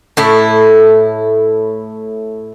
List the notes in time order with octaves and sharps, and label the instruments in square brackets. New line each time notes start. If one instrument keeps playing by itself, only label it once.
[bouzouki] A2 E4